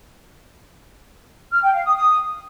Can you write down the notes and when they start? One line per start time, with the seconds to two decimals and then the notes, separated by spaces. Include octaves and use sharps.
1.52 F6
1.63 G5
1.74 F5
1.85 D#6
1.96 D#6